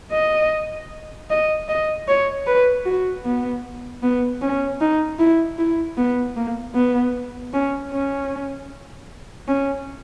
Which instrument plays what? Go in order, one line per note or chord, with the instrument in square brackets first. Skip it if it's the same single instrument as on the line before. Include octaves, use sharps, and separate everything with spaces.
[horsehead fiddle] D#5
D#5
D#5
C#5
B4
F#4
B3
B3
C#4
D#4
E4
E4
B3
A#3
B3
C#4
C#4
C#4